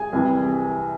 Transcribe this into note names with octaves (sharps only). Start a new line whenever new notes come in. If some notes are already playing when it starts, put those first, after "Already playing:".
Already playing: G#4 G#5
C2 C3 E3